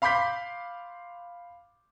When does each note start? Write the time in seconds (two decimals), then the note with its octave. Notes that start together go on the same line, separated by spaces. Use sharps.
0.02 F5 B5 C6 D6 G6 B6